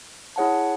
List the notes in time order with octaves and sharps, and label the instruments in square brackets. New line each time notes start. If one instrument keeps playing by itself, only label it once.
[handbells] E4 G#4 C#5 F#5 A5